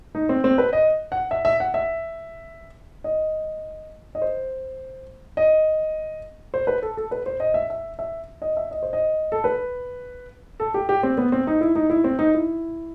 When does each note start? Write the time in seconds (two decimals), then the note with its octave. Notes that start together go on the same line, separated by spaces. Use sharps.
0.15 D#4
0.29 C4
0.44 C4
0.58 B4
0.73 D#5
1.12 F#5
1.31 E5
1.45 E5
1.60 F#5
1.74 E5
3.04 D#5
4.15 D#5
4.22 C5
5.37 D#5
6.54 C5
6.67 B4
6.82 A4
6.97 A4
7.11 B4
7.26 C5
7.40 D#5
7.54 E5
7.70 E5
7.99 E5
8.42 D#5
8.57 E5
8.71 D#5
8.82 C5
8.93 D#5
9.32 A4
9.44 B4
10.60 A4
10.74 G4
10.89 G4
11.03 C4
11.18 B3
11.32 C4
11.47 D#4
11.61 E4
11.76 D#4
11.90 E4
12.04 C4
12.19 D#4
12.34 E4